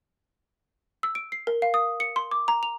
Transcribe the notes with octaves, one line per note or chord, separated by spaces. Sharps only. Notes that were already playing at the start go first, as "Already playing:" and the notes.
E6
D7
C7
A#4
F5
D#6
C#7
C6
D6
A#5
F7